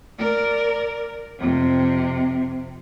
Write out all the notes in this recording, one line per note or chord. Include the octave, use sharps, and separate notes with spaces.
A#4 D5
F2 C3